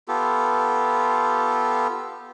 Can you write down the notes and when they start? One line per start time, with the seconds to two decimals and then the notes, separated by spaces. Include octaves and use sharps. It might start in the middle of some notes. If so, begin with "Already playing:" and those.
0.08 B3 F4 G4 A4